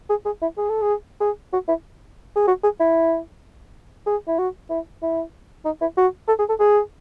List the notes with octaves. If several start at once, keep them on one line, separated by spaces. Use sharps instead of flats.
G#4
G#4
E4
G#4
A4
G#4
G#4
F#4
E4
G#4
F#4
G#4
E4
G#4
E4
F#4
E4
E4
D#4
E4
F#4
A4
G#4
A4
G#4